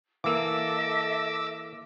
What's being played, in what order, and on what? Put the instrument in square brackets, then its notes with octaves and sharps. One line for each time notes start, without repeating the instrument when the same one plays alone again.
[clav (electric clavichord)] E3 A#3 [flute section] A4 D#5 E5 [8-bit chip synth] D6 E6